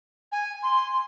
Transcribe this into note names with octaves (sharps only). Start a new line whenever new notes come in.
G#5
C6